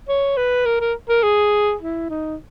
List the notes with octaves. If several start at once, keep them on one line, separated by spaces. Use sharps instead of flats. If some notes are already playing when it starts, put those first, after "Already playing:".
C#5
B4
A#4
A#4
A#4
G#4
E4
D#4